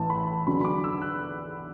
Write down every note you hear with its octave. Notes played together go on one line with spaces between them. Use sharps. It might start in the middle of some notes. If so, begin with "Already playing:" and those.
Already playing: A1 A2 E3 A5
B5
E2 D3 F#3 B5
B5
D6
E6
F#6